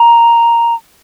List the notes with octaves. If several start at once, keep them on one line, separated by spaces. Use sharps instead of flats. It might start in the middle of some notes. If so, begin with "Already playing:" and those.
Already playing: A#5